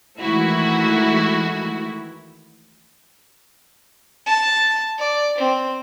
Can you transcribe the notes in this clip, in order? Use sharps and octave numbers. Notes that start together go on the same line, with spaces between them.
D#3 E3 G#3 A3 E4 F#4
A5
D5
C4